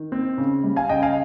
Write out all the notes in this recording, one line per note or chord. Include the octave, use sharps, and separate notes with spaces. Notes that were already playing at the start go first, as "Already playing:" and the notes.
Already playing: D#3
C4
C#3
G3
F5 G#5
C#3 D#5 G5
F5 G#5